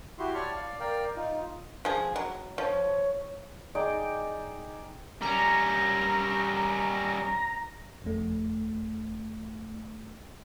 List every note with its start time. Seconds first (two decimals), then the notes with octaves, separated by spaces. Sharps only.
0.19 E4 F#4 G4 C6
0.35 C#5 D5 A5 C#6 F6
0.56 D5 F5
0.80 A#4 D5 F5 G5
1.16 D#4 F4
1.85 F3 G#4
2.16 F#3
2.58 F3 C#5
3.75 D#4 G#4 D5 G5
5.22 G3 C#4 A#5
8.02 G1 F2 A3